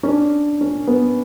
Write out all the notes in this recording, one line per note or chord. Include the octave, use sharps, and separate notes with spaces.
C#4
D4
C#4
B3